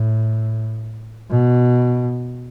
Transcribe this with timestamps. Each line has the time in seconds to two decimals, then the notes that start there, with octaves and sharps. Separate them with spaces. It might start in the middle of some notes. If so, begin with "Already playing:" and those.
Already playing: A2
1.31 B2